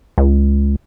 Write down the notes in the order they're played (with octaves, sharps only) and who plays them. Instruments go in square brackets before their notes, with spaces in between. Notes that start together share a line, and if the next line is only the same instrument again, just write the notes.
[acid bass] C#2